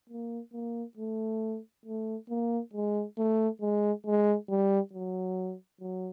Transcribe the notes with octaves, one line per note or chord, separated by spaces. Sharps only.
A#3
A#3
A3
A3
A#3
G#3
A3
G#3
G#3
G3
F#3
F#3